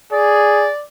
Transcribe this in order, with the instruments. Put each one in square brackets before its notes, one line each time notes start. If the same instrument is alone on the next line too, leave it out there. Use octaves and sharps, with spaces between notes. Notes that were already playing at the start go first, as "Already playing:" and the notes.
[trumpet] G#4 [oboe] D5